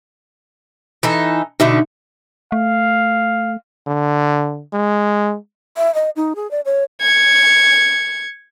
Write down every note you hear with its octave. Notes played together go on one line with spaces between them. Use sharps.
E3 D#4 A4
B2 D3 A3 D#4 E5
A3 F5
D3
G#3
E5
D#5
D#4
G#4
D5
C#5
G#6 C#7